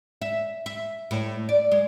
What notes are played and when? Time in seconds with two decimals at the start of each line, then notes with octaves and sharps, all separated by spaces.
0.22 E5
0.66 E5
1.11 A2
1.49 D5
1.72 G#3